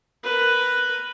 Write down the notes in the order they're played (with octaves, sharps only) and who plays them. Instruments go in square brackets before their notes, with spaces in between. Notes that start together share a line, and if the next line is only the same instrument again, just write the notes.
[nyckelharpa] A#4 B4